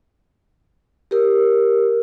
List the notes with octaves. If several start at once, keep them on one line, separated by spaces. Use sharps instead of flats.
G4 A#4